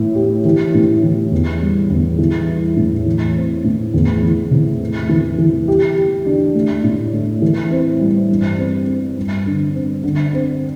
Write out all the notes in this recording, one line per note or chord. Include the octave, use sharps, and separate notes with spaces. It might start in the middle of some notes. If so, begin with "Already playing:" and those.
Already playing: A2 E3
G4
E3
A2
E3
E2
G3
E2
E3
E4
A2
E3
C4
A2
E2
E3
C3
A3
E3
E3
G4
G4
D4
A3
A2
A3
E3
C4
G3
G2
C4
C4
G2
D3
C4
D3
C4